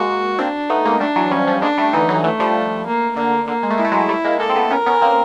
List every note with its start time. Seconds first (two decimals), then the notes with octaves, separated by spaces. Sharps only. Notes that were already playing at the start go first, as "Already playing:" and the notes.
Already playing: G#3 A#3 F#4
0.39 A#3 C4 D4
0.70 A3 B3 D#4
0.85 G#3 A#3
1.00 G3 A3 D4
1.16 E3 F#3
1.31 F3 G3 C#4
1.47 F3 G3
1.62 G#3 A#3 D4
1.78 G3 A3
1.93 D3 E3 D#4
2.09 E3 F#3
2.24 E3 F#3 A3
2.40 F3 G3
2.86 A#3
3.16 D3 A#3
3.48 D3 A#3
3.63 G#3
3.70 A3
3.78 G#3 E4
3.85 A3
3.92 F#3 G#3
4.09 G3 A3
4.24 G#3 A#3
4.40 G#3 A#3 A4
4.50 C4
4.56 A3 B3
4.71 B3 C#4 A#4
4.86 B3 C#4
5.01 A#3 C4